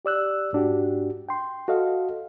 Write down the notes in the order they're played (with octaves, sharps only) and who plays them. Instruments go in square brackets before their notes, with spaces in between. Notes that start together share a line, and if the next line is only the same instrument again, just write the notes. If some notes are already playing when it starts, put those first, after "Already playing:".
[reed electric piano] G4 D5 E6 F#6
G#2 D4 F#4 G4
G5 C6
F#4 A4 D#5 F5